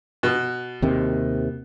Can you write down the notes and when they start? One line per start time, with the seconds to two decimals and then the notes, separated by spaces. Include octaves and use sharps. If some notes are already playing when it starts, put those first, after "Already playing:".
0.23 B2
0.82 D#2 C3 D#3